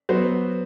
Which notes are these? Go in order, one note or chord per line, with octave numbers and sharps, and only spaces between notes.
F#3 B3 F#4 C5